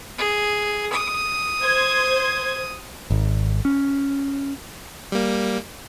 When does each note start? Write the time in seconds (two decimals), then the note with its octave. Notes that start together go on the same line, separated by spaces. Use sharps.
0.18 G#4
0.92 D#6
1.63 C5 G#6
3.10 G#1
3.65 C#4
5.12 G3 A#3